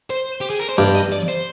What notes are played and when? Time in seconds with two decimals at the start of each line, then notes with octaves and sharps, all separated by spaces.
0.10 C5
0.41 G4
0.50 G#4
0.59 A#4
0.69 C5
0.78 G2 D5
0.95 D#5
1.12 D5
1.28 C5